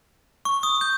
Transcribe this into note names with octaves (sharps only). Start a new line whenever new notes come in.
C#6
D#6
G6